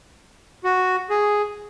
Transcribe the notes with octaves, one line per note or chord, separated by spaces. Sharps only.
F#4
G#4